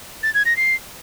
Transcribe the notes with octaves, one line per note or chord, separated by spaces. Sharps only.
A6
G#6
A#6
C7